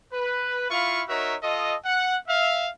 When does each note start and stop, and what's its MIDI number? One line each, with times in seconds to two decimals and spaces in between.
0.13 0.69 71
0.70 1.02 64
0.70 1.02 65
0.70 1.02 77
0.70 1.02 83
0.70 1.02 85
1.08 1.35 63
1.08 1.35 66
1.08 1.35 70
1.08 1.35 73
1.08 1.35 76
1.43 1.75 65
1.43 1.75 69
1.43 1.75 75
1.85 2.17 78
2.28 2.68 76
2.28 2.68 77